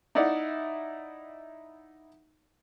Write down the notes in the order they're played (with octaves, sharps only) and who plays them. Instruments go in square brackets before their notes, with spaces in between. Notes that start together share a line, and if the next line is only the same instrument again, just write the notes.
[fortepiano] D#4 E4 D5 F#5